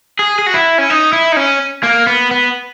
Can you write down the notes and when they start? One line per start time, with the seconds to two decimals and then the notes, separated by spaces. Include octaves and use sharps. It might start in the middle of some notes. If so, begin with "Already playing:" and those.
0.19 G#4
0.39 G#4
0.47 F#4
0.54 E4
0.78 C#4
0.90 D#4
1.13 E4
1.32 D#4
1.36 C#4
1.83 A#3
2.07 B3
2.31 B3